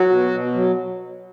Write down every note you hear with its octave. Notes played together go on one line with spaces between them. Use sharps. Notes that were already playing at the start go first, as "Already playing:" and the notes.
Already playing: F#3 F#4
B2
B2
F#3